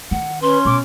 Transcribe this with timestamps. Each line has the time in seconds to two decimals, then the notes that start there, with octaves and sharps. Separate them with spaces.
0.11 D#3 F#5
0.42 C#4 B4 C6
0.65 B2 D6